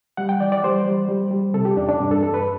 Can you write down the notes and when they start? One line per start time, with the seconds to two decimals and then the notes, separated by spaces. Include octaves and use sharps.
0.17 G3 F#5
0.29 G5
0.40 E3 D5
0.52 D5
0.64 G3 C5
0.86 G3
1.09 G3
1.31 G3
1.54 C3 A4
1.65 G4
1.77 E2 D4
1.89 D4
2.00 G2
2.11 A4
2.23 G2 A4
2.34 B4